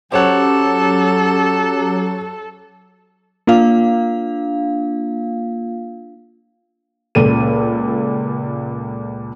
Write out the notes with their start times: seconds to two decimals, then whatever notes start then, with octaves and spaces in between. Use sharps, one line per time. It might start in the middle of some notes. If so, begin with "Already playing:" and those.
0.12 F#3 C#4 G4 A4 C5 C#5 F#5 D6
3.47 A#3 D4 F4 F5
7.15 C#2 A#2 A4 D#7